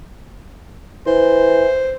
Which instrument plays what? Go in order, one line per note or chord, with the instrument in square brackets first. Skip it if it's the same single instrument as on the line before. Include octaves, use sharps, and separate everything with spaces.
[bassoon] E3 [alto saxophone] C5